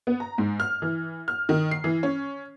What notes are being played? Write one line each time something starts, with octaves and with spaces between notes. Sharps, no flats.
B3
A#5
G#2
F6
E3
F6
D#3
C7
E3
C#4